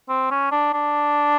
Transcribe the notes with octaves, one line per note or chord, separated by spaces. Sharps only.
C4
C#4
D4
D4